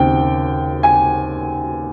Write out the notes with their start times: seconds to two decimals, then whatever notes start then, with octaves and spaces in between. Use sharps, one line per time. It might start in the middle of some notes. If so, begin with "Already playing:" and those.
Already playing: D#2 C#3 C4 G5
0.83 G#5